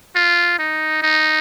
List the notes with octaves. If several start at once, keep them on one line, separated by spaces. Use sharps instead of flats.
F4
D#4
D#4